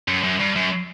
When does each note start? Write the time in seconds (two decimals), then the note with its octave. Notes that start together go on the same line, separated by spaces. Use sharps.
0.08 F#2
0.24 F#2
0.39 G2
0.56 F#2